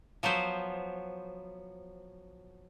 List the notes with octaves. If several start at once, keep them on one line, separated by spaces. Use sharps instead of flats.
F3 F#3 B3 C5